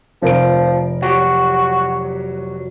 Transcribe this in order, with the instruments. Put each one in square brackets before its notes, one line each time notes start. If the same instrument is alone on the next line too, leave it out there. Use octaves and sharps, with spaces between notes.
[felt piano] F1 A#4 D7 [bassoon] F3
[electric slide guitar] F#3 G4 C#5 [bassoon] F#4